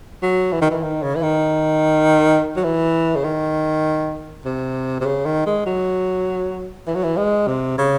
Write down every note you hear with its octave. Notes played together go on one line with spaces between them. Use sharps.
F#3
E3
D#3
E3
D#3
C#3
E3
D#3
F#3
E3
C#3
D#3
C3
C3
C#3
D#3
G#3
F#3
E3
F#3
E3
G#3
C3
C#3